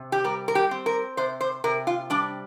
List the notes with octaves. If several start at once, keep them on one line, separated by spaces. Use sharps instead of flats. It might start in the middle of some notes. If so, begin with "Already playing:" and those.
Already playing: C3
G4
G3 A#4
A#4
G4
C4
A#4
C3 C5
C5
C3 A#4
F4
G3 D4